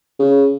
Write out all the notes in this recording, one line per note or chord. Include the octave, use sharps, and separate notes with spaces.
C#3